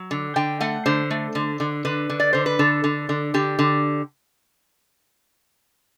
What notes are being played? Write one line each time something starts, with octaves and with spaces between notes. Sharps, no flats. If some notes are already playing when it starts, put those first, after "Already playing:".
Already playing: F#3
D3
D3 G5
A3 F#5
D3 C5
A3
D3
D3
D3 B4
D3
D5
D3 C5
B4
D3 A4
D3
D3
D3 G4
D3